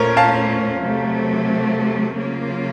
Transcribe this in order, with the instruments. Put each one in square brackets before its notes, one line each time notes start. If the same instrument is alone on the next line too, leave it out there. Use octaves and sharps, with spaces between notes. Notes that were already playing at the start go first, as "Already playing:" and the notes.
Already playing: [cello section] A#2 A3 C#4 F4 [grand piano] A#4 C5 C#5
[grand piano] F5 A5
[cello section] C3 F#3 A3
C#3 F#3 A#3 F4